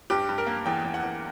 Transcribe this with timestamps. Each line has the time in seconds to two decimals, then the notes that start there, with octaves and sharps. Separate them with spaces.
0.10 G2 G4
0.29 G2
0.38 A#4
0.47 A#3
0.66 E2 G5
0.84 E2
0.94 F#5
1.03 E2